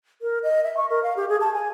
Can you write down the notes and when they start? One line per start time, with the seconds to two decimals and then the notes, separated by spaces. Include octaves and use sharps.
0.22 A#4
0.43 D#5
0.64 E5
0.77 C#6
0.90 A#4
1.03 F5
1.17 G4
1.29 G#4
1.41 A5
1.54 G#5